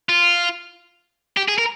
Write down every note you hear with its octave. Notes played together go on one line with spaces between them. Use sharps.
F4
G4
G#4
A#4